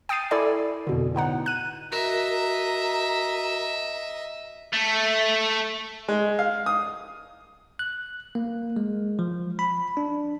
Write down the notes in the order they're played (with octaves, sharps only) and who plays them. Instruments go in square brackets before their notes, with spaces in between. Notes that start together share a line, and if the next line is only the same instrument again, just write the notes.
[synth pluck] G5 D#6 A6 C7 D#7
E4 A4 D5 G#5
F2 B2 D3
A2 B3 D#4 F#5
F#6 D#7
[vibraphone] F#4 A#4 [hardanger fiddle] D#5 E5 [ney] A#5
[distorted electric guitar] A3
[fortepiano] G#3
F5
D#6
[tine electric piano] F#6
A#3
G#3
F3
B5
D4